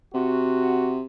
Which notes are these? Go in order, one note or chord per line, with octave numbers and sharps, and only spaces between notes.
C3 F#4